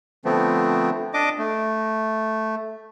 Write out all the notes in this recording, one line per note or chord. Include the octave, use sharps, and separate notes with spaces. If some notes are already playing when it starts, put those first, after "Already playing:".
D3 F3 A3 B3 C4
D4 D#5 D6
A3